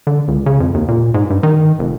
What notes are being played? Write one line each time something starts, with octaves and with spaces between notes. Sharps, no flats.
D3
C#2
C#3
F2
D#2
A#2
G#2
G2
D#3
F1